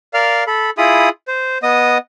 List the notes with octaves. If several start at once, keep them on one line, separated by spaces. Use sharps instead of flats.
A#4 D5 F5 F6
A4 B5
E4 F4 G#4 B5 D#6
C5
B3 D#5 D#6